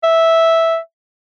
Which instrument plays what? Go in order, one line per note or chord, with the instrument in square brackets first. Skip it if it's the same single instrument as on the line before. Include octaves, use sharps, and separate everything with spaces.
[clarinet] E5